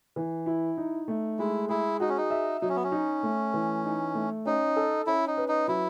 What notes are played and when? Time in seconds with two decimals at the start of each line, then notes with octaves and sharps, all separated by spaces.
0.16 E3
0.46 E4
0.77 D#4
1.08 A3
1.39 G#3 E4
1.69 E4 G#4
2.00 D#4 F#4
2.09 C#4
2.17 D#4
2.30 E5
2.61 F#3 D#4
2.69 C#4
2.76 B3
2.84 C#4
2.92 D#4
3.23 A3
3.54 E3
3.85 D#4
4.15 A3
4.46 C#4 D#4
4.77 A4
5.07 C#4 E4
5.27 D#4
5.37 B4
5.49 D#4
5.68 F#3 E4